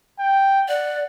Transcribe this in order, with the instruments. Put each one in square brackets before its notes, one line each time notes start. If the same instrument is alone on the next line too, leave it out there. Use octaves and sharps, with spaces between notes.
[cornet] G5
[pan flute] D5 [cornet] F#5